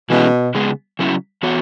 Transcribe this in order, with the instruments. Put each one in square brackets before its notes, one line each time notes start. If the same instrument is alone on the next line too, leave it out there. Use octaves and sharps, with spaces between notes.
[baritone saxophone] B2 [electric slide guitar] E3 G#3 C#4 E4
[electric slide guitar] C#3 G#3 B3 G#4
C#3 F#3 C#4 E4
E3 B3 F#4 C#5